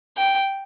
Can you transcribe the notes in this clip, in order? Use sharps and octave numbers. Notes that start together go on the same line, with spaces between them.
G5